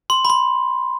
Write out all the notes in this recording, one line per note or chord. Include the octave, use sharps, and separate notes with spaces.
C6
B5
C6